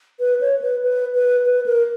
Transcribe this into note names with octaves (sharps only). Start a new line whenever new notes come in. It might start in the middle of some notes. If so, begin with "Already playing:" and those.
B4
C#5
B4
B4
B4
B4
A#4